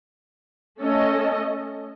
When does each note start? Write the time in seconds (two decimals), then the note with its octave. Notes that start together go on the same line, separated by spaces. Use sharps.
0.82 A3 C#4 A4 D#5